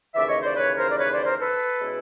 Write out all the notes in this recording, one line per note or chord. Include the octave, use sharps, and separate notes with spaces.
D#2 C#3 E3 D5 E5
C#5 D#5
C5 D5
B4 C#5
A#4 C5
D5
B4 C#5
C5 D5
A#4 C5
A4 B4
B2 G#3 C#4 E4